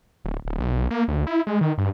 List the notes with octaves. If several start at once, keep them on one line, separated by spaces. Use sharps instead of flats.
D1
D1
B1
A#3
D2
E4
G#3
D#3
G2